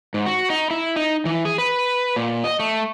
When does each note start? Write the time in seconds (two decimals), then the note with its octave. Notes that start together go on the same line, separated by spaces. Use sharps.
0.14 G#2
0.26 F#4
0.50 D#4
0.71 E4
0.96 D#4
1.25 E3
1.45 G#4
1.58 B4
2.16 A#2
2.44 D#5
2.60 A3